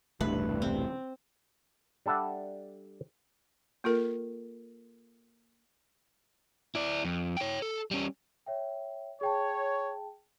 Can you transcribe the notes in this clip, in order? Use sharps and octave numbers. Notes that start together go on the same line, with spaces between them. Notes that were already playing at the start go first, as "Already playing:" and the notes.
E1 C2 G2 A3 B4
C4
G3 D4 A4 E5 F#5
A#3 F4 A4 A#4
E4 D5
F2
C#5 G5
A4
G3 C#4
C#5 E5 G5
G#4 C#5 G5 A5